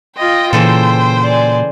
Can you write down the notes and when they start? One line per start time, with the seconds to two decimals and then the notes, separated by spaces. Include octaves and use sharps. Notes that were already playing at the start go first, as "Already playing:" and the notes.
0.17 F4 D#5 G5
0.53 A#2 C#3 E3 A4 C5
1.24 D5 G#5